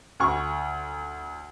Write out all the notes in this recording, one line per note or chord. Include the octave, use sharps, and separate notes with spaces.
D2 C#6